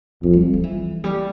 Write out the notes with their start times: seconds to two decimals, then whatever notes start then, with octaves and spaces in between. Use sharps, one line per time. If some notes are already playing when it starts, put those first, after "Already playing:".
0.23 F2 A3
0.33 G3
0.53 F3
0.63 E3
1.04 G3